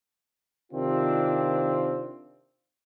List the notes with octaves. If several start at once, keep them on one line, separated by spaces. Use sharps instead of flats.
C3 D#3 C4 D4 F4